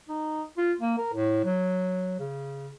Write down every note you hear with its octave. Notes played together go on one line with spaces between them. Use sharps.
D#4
F4
A#3
A#4
A2
F#3
C#3